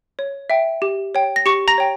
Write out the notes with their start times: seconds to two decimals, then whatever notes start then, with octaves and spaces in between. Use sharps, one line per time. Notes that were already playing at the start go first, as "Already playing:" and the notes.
0.19 C#5
0.50 E5 G5
0.82 G4
1.15 C#5 G5
1.36 A#6
1.46 G4 C#6 C#7
1.68 A#5 A#6
1.78 C#5 G5